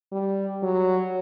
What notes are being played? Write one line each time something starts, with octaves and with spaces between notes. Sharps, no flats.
G3
F#3